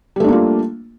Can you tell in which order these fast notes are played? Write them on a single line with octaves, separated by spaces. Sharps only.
G3 A3 D4 A#3 F4